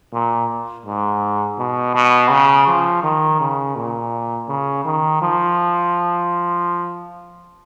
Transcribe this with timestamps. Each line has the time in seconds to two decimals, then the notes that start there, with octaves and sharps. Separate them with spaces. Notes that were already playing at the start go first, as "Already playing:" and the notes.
0.12 A#2
0.86 G#2
1.58 B2
1.95 B2
2.30 C#3
2.67 F3
3.03 D#3
3.40 C#3
3.76 A#2
4.49 C#3
4.85 D#3
5.21 F3